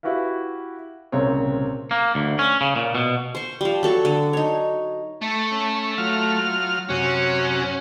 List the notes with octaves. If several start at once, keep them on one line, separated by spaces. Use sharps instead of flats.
E4 F#4 G4 B4 F5
C2 A#2 C#3 C4 C#5
A#3
D2
C#4
C#3
A#2
B2
C5 C#6
F3 G3
F#3 A4 C#6
D3
D#4 C#5
A3
C#4
F#3 F4 F6
F#2 C3 C#4 F#4